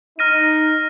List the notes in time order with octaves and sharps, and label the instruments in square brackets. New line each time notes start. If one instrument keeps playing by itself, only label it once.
[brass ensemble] D#4 [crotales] F6 A#6 D#7